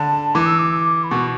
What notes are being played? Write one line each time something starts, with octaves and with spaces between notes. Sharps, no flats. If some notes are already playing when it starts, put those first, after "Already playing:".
Already playing: D3 A5
E3 D6
E6
D6
B5
B2 C#6